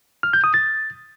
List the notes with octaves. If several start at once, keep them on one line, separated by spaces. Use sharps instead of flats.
F6
G6
D#6
A6